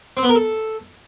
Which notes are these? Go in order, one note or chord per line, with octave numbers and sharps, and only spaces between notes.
C4
B3
A#4
A4